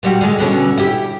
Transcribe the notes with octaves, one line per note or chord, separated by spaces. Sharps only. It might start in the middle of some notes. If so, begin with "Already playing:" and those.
A#2 G3 F#4
D3 G#3
B2 D3 C#4
E4 G4